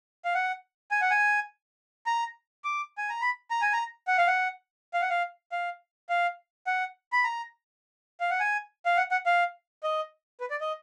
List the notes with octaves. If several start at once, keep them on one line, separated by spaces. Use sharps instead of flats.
F5
F#5
G#5
F#5
G#5
A#5
D6
G#5
A#5
B5
A#5
G#5
A#5
F#5
F5
F#5
F5
F#5
F5
F5
F5
F#5
B5
A#5
F5
F#5
G#5
F5
F#5
F#5
F5
D#5
B4
D5
D#5